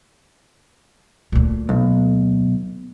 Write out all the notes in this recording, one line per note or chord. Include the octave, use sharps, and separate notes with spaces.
D2 A#2
B1